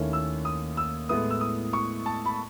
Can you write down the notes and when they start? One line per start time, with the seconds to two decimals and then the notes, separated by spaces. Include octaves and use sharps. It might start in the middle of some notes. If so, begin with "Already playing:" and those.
Already playing: D#2 D#3 A3 C#4 E4
0.13 E6
0.45 D#6
0.77 E6
1.09 A2 G#3 B3 E4 D#6
1.30 E6
1.41 D#6
1.73 C#6
2.06 A5
2.25 B5